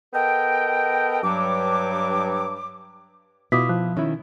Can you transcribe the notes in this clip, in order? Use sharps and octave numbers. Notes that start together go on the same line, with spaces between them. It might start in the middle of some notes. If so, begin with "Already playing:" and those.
B3 A4 A#4 D#5 G5
G2 F#3 D6
B2 E4 F4 D6 D#6 B6
F3 F#6
D#3 C#4 E4